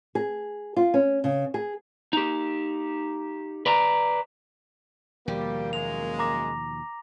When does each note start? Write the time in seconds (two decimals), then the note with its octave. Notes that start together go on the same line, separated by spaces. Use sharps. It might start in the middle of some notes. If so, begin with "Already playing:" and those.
0.15 G#4
0.76 F4
0.94 C#4
1.24 C#3
1.54 G#4
2.13 D#4 G4
3.66 B4 D5 A#5
5.28 D#2 B2 F3 G3 A#3 G4
5.73 F#2 G#3 F7
6.19 A#5 D6 A#6